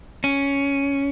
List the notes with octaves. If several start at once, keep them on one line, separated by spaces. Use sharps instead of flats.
C#4